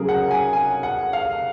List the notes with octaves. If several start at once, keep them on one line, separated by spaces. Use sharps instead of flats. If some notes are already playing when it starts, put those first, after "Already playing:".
Already playing: C#3 F#3 C#4 G#4 A#4
F#5
G#5
G#5
F#5
F5